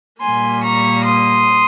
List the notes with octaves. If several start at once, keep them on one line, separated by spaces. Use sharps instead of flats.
A#2 G3 A#3 G#5 C6
A#5 C#6
C6 D#6